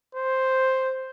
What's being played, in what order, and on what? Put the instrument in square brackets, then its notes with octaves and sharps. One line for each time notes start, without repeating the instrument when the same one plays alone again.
[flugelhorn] C5